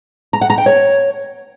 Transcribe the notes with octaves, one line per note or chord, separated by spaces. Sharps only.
A#5
F#5
A#5
G5
C#5